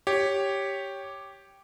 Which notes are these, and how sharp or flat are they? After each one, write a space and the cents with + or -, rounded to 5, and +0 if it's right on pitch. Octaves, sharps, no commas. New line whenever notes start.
G4 +0 C#5 +0